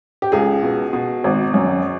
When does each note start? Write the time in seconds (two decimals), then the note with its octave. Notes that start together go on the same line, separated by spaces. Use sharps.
0.22 G4
0.32 C#2 G#4
0.63 B2
0.93 B2
1.24 G#1
1.54 F#2